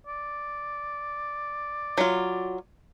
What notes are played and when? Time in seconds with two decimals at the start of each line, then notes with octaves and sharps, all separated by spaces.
0.07 D5
1.98 F#3 F4